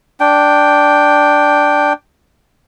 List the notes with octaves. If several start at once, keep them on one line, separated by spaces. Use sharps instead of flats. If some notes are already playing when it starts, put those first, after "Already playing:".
D4 G5